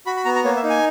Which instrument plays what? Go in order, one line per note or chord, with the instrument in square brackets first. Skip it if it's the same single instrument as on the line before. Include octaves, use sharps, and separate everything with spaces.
[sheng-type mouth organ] F#4 B5
B5
B3 A#5
A#5
A#3 C#5
E5
D#4
G#5